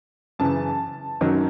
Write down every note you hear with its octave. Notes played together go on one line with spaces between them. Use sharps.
F#2 C#3 E3 A5
F#2 D#3 F#3